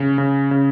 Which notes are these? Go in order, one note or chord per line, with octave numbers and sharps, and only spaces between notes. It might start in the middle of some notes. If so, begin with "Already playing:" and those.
Already playing: C#3
C#3
C#3